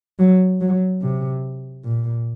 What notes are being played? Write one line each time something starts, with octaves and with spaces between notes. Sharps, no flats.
F#3
F#3
C3
A#2